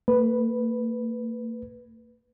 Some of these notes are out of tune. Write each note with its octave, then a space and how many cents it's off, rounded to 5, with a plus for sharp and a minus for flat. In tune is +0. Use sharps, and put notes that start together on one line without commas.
A#3 -45 B4 +0